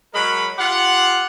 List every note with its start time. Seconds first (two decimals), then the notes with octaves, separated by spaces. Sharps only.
0.14 F#3 G#3 G#4 A#4 B5
0.59 F4 G4 F#5